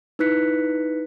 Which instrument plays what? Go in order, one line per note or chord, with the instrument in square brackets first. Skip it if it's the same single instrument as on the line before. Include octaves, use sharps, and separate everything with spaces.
[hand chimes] D#4 E4 B4 F#6 B6 C#7